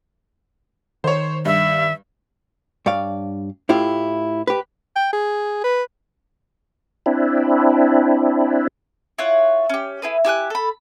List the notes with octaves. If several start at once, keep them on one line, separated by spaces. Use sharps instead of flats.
D#3 C5 C#5
G2 E5
G2 C#5 D5 F5
A2 E4 F4 G4
G4 B4
G5
G#4
B4
C4 D4 E4
E4 F4 C#5 F#5
C#4 G4
E4 G#4 B4
E4 G4 G#5 F#6
A4 B5